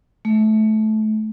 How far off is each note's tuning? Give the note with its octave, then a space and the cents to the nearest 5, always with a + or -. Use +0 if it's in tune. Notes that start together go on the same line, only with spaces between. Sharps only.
A3 -20